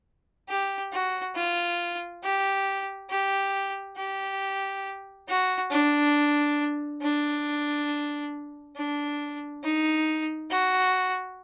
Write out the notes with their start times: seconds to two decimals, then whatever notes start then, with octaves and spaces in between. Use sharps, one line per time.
0.49 G4
0.92 F#4
1.36 F4
2.23 G4
3.10 G4
3.97 G4
5.28 F#4
5.71 D4
7.02 D4
8.76 D4
9.63 D#4
10.50 F#4